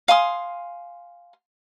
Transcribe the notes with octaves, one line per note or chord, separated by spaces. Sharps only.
F5 G#5 C6 D#6